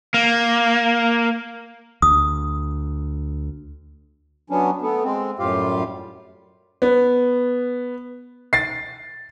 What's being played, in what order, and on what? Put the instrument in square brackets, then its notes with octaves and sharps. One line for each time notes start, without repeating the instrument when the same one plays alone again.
[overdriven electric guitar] A#3
[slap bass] D2 [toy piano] D#6
[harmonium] F#3 B3 C#4 D4
A3 B3
G#3 C4
F#2 A2 G3 F4 G4 F5
[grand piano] B3
A6 C7